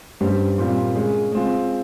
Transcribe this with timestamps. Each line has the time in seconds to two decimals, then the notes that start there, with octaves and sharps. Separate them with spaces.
0.21 G2 G3 C#4 G4 C5
0.58 A#2 G3 C4 F4
0.95 C#3 G#3 C#4 G#4
1.32 G#3 C4 F4